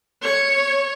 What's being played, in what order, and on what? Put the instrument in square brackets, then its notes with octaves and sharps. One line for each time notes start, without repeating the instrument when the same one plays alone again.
[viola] C#5